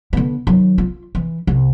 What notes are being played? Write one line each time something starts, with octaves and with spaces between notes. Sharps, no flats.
D3 B3
D#3 F#3
F4
E3
C2